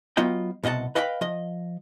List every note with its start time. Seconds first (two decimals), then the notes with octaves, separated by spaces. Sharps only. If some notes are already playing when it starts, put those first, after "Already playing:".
0.17 F#3 B3 F4 D#5 G5
0.64 C2 B2 D#5 F#5 A5
0.95 B4 D#5 F5 G5 A#5 B5
1.21 F3 D#5